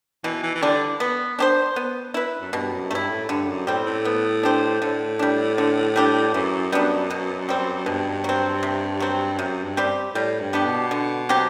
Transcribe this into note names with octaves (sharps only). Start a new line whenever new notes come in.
B2 E3
E3
E3
D3 G3 D4
B3
D4 G4 C5
B3
E4 B4
F#2
G2 B2
F#2
G2 A3 E4
A2
G2 D3
F#2
A2 G3 C4
A2
B3
D4 G4 C5
A2 D3
G3 D4
D3
G3 D4 G4
F#2 E3
G3 B3 D4
B2
G3 C4
G2 B2
F#3 C4
C3
F#3 C4
F#2 C3
G2
G3 C4 G4
A2 G3
G2
B3 D4 G4
B2
D3
F#3 C4 G4